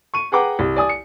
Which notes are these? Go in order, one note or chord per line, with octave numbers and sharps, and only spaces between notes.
C#6 D#7
G#4 B4 F#5 G5 A#5 D6
C2
D5 G#5 D#6
C#7